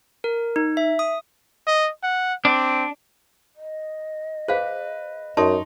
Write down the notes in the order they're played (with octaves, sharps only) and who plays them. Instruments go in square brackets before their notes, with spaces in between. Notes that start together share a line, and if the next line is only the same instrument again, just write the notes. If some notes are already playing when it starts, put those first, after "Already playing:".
[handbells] A#4
D#4
E5
D#6
[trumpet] D#5
F#5
[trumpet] C4 [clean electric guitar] D4
[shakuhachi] D#5
[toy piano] G#4 C5 F5 [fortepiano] B4
[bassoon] F#2 [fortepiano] D#4 [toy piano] A5 C6 C#6